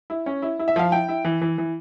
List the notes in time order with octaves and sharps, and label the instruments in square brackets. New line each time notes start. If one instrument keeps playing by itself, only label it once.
[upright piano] E4
C#4
E4
E4
E5
F3 F5
E4 G5
E4
E3
E3
E3